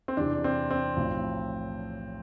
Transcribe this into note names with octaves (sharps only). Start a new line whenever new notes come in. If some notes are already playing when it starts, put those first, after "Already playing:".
C4
E2 C3 E3 D4
C4
C4
B1 A2 F3